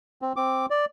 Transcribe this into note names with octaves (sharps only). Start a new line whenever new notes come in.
C4
C4 D6
D5